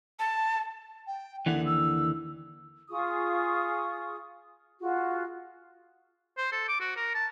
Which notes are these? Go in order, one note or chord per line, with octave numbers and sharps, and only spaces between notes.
A5
G5
D#2 D3 E3 F#5
E6
F4 G#4 C#6 D#6
F4 F#4 G#4
C5
A4
D6
F#4
A#4
A5